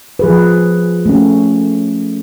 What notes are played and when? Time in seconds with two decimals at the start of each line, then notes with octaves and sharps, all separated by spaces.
0.19 F3 G#4 B4
1.06 A3 C#4